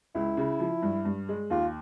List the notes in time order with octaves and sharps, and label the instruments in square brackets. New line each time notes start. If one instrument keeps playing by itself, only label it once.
[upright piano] C#2 [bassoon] E4
[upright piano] C#3
F3
G2
G2
G#3
[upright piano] D#2 [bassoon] F4